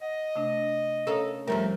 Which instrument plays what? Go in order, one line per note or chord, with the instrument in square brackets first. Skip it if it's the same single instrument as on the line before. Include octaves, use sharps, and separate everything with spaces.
[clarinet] D#5 [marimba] F#5
[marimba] C3 A3 D4
[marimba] C#4 C#5 D#6 [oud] A4 A#4 F5
[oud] F2 F3 A#4 [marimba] G3 G4 A#5 [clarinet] A3